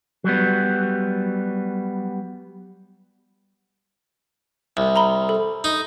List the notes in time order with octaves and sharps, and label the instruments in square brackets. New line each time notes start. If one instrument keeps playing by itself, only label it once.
[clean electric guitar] F#3 G3 B3
[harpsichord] C2
[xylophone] A#5 B5 G7
A4
[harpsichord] D#4